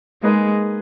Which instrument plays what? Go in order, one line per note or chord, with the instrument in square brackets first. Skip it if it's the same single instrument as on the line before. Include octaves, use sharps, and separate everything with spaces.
[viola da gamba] G#3 [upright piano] A#3 D#4 G#4 B4 D#5